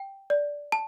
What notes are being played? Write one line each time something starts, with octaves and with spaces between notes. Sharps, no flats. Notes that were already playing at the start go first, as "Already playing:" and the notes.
Already playing: G5
D5
A5